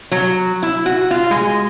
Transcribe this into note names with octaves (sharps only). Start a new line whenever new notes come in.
F#3
E4
F#4
F4
G#3